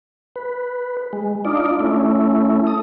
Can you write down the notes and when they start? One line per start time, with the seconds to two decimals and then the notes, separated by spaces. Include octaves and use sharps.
0.36 B4
1.13 G#3
1.45 D4 D#4 F4 D5
1.80 A3 C#4 E4
2.67 A4 D#6